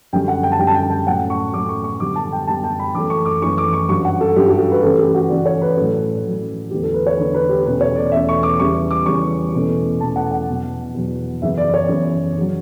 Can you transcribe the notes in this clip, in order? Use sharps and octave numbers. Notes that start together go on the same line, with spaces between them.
F#2 D3 G3 C#4 G5
F#5
G5
A5
F#2 D3 G3 C#4 G5
A5
G5
A5
G5
A2 F#3 A3 C#4 F#5
C#6
A2 F#3 A3 C#4 D6
C#6
C#6
F#2 D3 G3 B3 D6
A5
G5
F#2 D3 G3 B3 A5
G5
B5
F#2 E3 A3 C#4 D6
C#6
D6
F#2 E3 A3 C#4 C#6
D6
C#6
G2 F#3 C#4 C#6
F#5
A4
G2 F#3 C#4 G4
F#4
A4
B4
C#3 E3 A3 C#4 A4
G4
F#4
C#3 E3 A3 C#4 D5
C#5
B4
A2 F#3 C#4 A4
A2 F#3 C#4
E2 D3 A3 G4
A4
B4
C#5
E2 D3 A3 B4
B4
G4
E2 B2 A3 C#4 B4
C#5
D5
E2 B2 A3 C#4 E5
C#6
D6
E2 C#3 G3 C#4 C#6
D6
E2 C#3 G3 C#4 C#6
E2 B2 A3 C#4
E2 B2 A3 C#4 A5
F#5
F#5
E2 B2 F#3
E2 B2 F#3
F#2 C#3 E3 B3 E5
D5
C#5
F#2 C#3 E3 B3
C#3 F#3